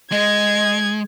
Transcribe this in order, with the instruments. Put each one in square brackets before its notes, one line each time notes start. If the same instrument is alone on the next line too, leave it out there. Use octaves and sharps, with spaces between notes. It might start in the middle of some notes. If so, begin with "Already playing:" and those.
[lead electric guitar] G#3 [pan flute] D#5 [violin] G#6